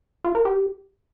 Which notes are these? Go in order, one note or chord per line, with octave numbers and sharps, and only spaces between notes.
F4
A#4
G4